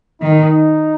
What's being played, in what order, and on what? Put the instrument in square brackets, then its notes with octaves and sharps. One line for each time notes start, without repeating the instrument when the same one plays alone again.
[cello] D#3 [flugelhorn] D#4